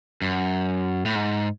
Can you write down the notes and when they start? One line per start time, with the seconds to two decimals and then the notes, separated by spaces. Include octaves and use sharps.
0.22 F#2
1.05 A2
1.15 G#2